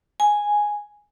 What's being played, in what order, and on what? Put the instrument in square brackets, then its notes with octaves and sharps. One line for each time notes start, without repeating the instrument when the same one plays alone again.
[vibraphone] G#5